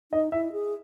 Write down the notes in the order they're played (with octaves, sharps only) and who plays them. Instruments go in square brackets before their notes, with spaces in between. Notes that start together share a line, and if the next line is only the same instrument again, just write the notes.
[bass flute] D#4 [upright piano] D#5
[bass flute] E4 [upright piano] E5
[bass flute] G#4